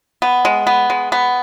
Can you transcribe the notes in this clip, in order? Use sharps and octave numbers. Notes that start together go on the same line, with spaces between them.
B3
G#3
B3
G#3
B3